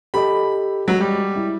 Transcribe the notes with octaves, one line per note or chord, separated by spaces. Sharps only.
G4 A4 D#5 B5
F#3 G#3
G3
E4